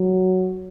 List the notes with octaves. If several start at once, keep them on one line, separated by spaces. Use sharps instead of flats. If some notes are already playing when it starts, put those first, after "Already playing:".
Already playing: F#3